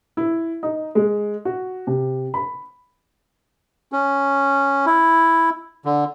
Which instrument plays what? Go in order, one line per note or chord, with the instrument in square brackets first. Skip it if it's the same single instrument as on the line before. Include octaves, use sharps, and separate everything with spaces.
[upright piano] E4
D#4
G#3
F#4
C3
B5
[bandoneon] C#4
E4
D3